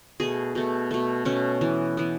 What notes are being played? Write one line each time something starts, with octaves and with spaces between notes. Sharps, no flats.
B2 A3 G#4
B2 A3
B2 A3
B2 A3 C#4
E3 B3
E3 B3